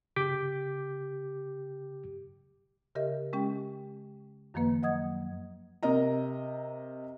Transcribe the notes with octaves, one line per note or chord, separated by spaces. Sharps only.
C#3 G4 D6 G6 B6
C#3 G4 A#4 D#5 E5
G#3 C#4 G4 G5
F#2 D#3 F3 A#3 B4
F#3 D#5 F#5 D#6 G#6
C3 A#4 D#5 A#5